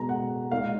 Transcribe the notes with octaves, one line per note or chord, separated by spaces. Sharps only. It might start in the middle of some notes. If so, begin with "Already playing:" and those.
Already playing: B2 G#3 B3 A#5
F#5
A#2 G#3 D#4 F5